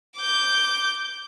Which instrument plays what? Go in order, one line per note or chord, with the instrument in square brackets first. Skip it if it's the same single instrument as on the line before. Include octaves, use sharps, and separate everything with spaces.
[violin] D6 G6